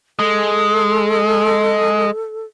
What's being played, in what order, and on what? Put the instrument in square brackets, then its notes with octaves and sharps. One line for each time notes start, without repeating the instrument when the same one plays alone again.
[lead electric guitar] G#3 [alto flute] A4